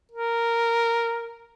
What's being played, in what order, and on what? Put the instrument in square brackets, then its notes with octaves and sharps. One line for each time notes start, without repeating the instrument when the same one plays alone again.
[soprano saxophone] A#4